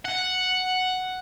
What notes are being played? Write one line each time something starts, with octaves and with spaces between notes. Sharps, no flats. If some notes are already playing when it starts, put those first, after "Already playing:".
F#5